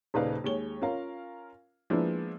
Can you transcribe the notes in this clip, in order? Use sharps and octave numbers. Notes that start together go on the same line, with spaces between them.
D#1 C#3 D#4 B4 D5 F5
D#2 G#3 C#5 G7
C#4 F4 A#4 F5
F3 G#3 A#3 B3 D4 E4